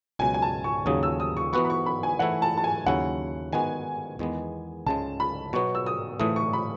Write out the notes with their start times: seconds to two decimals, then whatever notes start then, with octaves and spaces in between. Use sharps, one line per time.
0.19 C#2 B2 F#3 G#5
0.34 G#5
0.42 A5
0.64 C#6
0.86 D#2 C#3 F#3 D#6
1.03 E6
1.20 D#6
1.37 C#6
1.53 E3 B3 F#4 B4 C#6
1.65 B5
1.70 C#6
1.86 B5
2.03 G#5
2.19 E3 A3 E4 F#5
2.42 A5
2.57 A5
2.64 G#5
2.86 D#2 C#3 F#3 C#4 E4 F#5
3.53 D#3 G#3 B3 F#4 G#5
4.19 E2 D#3 G#3 B3
4.86 C#2 C#3 G#3 A5
5.20 B5
5.53 B2 F#3 B3 C#6
5.75 E6
5.86 D#6
6.20 A2 E3 A3 D#6
6.36 C#6
6.53 B5